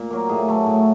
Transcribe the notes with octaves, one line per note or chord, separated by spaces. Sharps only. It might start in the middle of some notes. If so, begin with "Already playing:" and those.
Already playing: A#2
F#3 A#3
A2 G#4
F#3 A3
A2